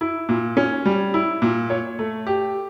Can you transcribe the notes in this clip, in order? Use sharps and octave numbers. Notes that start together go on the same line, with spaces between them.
E4
A#2
C#4
G3
E4
A#2
C#5
A3
G4